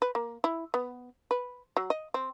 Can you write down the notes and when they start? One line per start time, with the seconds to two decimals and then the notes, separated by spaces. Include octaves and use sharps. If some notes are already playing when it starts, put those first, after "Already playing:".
0.02 B4
0.15 A#3
0.44 E4
0.74 B3
1.31 B4
1.77 F#3
1.90 D#5
2.14 C4